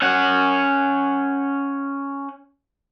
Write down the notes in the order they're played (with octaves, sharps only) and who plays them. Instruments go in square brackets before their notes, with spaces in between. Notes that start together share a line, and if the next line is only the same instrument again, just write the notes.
[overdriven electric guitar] C#4 F#5